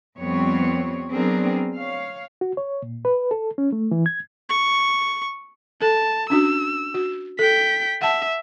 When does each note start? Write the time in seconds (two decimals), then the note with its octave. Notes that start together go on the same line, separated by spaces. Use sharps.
0.18 F2 G3 B3 C4 C#5
1.10 F#3 B3 C4 D4 G#4 A#4
1.75 C#5 F5
2.41 F#4
2.57 C#5
2.82 A#2
3.05 B4
3.31 A4
3.58 C#4
3.72 A3
3.91 E3
4.06 G#6
4.49 C#6
5.82 A4 A5
6.30 C#4 D4 F#4 E6
6.94 F#4
7.39 A4 G5 B6
8.02 E5 F#5 A5